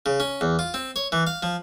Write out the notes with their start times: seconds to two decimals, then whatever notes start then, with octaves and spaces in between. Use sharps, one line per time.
0.06 C#3
0.20 C#4
0.41 E2
0.59 F4
0.74 C4
0.96 C#5
1.12 E3
1.27 F5
1.43 F3